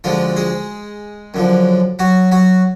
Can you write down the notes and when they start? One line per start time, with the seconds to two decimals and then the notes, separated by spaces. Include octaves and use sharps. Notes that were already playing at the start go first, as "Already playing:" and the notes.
0.04 D2 D3 F3 G#3 F4
0.36 G#3 G#4
1.34 F#2 D3 F3
1.99 F#3 F#4
2.32 F#3 F#4